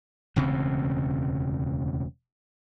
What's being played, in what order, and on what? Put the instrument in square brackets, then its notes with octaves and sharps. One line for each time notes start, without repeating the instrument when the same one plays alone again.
[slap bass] E1 D2 C#3 C4